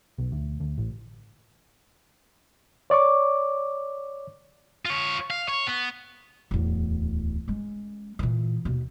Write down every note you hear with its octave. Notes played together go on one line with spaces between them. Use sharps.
B1
D2
D2
A1
C#5 D5 C#6 D6
F4 C#5
F5
C#5
B3
D1 E2
G#3 C#4
A#2 E3
D#2 B2